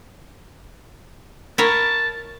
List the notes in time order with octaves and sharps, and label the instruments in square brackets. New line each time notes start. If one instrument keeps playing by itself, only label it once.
[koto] E4 A#4 C#5 [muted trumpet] A5